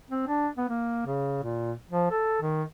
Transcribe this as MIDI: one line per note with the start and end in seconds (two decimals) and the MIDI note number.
0.10 0.24 60
0.27 0.48 62
0.57 0.66 59
0.69 1.05 58
1.06 1.41 49
1.43 1.72 46
1.91 2.08 53
2.11 2.41 69
2.42 2.63 51